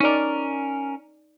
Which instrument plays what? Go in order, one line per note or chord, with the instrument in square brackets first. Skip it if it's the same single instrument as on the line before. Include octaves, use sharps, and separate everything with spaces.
[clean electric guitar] C#4 A#4 [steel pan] D#4 D5